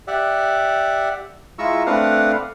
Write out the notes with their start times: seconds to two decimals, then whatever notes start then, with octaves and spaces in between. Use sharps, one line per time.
0.07 G4 D5 E5 F#5
1.59 G#3 E4 F4 A#5 C#6 E6
1.86 A3 C4 D4 B4 F5 F#5